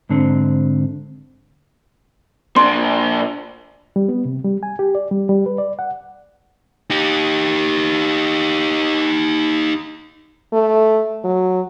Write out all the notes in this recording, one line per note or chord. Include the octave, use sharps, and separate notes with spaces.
G#2 D3 C4
A#2 D4 C6
G3
B3
C3
G3
G#5
G4
D5
G3
G3
B4
D5
F#5
D#4 G4
A3
F#3